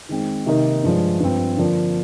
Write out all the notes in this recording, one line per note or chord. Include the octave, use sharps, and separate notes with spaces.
D#3 G#3 C4
C3 D#3 A#3 D#4
G2 F3 G#3 D4
G2 F3 C4
D3 F3 A#3 D4